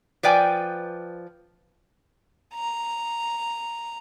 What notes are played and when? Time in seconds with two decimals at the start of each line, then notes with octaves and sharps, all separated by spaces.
0.23 F3 B4 D5 G5 G#5
2.54 A#5